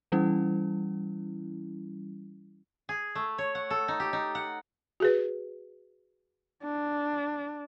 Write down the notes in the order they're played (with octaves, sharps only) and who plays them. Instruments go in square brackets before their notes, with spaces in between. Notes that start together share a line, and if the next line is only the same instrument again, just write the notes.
[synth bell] E3 G3 C#4 E4
[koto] G#4
A3
C#5
F#5
A4
D#4
G4
D#4
F#5
[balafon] F#4 G#4 B4
[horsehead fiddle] D4